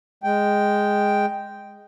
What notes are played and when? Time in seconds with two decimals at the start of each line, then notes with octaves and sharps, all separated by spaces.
0.24 G#3 G5